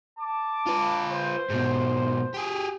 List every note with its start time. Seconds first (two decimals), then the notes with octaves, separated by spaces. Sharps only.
0.19 A5 D6
0.67 F4 B4
1.11 C5
1.50 G#2 B2
2.34 G4 G#4